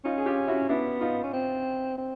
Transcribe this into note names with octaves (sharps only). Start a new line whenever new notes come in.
C#4 D#4 F4
G#4
F4 G4
E4 F#4
B3 D4 E4
D#4 F4
C#4
C4
C4